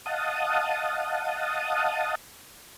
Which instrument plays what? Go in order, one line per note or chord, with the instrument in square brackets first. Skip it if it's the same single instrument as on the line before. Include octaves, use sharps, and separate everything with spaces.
[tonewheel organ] D#5 F5 F#5 A5 D#6